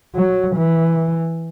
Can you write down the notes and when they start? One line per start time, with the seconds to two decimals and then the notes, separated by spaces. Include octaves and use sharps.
0.15 F#3
0.56 E3